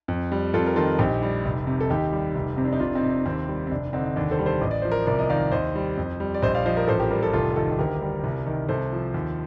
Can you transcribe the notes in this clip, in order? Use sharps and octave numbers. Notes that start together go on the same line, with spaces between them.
F2
G3
F2 F4 A4
A#4
D#3 F4 A4
A#1 D#4 G4
G3
F1
C3
A4
D#2 D#4 G4
G3
F1
C3 C4
D4
D#4
F1 D4 F4
C4 D#4
C3
D4
D#2 C4
G3
C4
F1 D4
D3 C4 D#4
D#4
D#2 D4
A4 C5
G3
A4 C5
A1 D#5
D5
F3 C5
A#4 D5
C2 A#4 D5
D#5
D#3 D5 F5
D#2 C5 D#5
G3
F2
G3
D5
A#1 C5 D#5
D5 F5
F3 C5 D#5
A#4 D5
A1 A4 C5
G4 A#4
G3 G4 A#4
F4 A4
F1 F4 A4
D#3 F4 A4
D2 G4 A#4
G3
C2
D#3
C2 A4 C5
F3
D#2